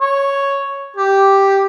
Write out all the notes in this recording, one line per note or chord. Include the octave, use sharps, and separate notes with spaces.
C#5
G4